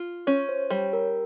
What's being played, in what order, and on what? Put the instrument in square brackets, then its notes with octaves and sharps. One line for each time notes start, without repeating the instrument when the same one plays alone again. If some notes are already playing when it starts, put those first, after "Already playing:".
Already playing: [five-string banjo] F4
[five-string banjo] C#4 [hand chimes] C#5
[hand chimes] C5
[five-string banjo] G3 [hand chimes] C#5
[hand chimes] A#4